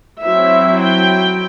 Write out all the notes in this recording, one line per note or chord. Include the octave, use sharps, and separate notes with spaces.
F#3 C4 E4 E5
G5